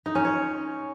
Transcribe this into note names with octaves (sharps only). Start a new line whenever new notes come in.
D#4
C#4
C#5